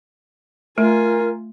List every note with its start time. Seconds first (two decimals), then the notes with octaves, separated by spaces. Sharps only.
0.78 A3 F4 A#4 G#5